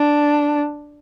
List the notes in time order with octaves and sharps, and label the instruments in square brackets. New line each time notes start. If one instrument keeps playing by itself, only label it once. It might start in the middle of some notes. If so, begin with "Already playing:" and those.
Already playing: [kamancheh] D4